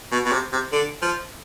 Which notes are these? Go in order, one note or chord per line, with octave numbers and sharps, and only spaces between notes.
B2
B2
C3
C3
D3
F3